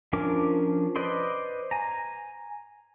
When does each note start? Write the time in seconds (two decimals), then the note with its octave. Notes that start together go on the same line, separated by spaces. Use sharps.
0.13 F3 C#4 D4 A#4 D6
0.96 B4 C5 D5 D#5 C6
1.71 G#5 A#5